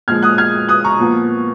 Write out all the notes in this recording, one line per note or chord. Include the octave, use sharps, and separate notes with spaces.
A#2 F3 G#3 F6 G#6
D#6 F#6
F6 G#6
D#6 F#6
A#5 C#6
A#2 F3 B3